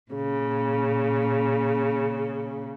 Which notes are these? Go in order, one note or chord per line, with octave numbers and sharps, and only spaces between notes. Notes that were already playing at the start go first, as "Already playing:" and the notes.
A#2 C#3